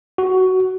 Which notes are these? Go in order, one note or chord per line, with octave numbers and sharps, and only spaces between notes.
F#4